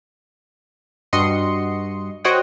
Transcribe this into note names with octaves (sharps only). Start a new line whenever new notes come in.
G2 F#4 D#5 C6 C#7
F#4 C5 C#5 D#5 F#5 G5